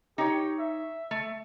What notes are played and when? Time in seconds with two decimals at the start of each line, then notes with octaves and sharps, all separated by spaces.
0.18 D#4 G4 C#5
0.59 E5
1.11 A3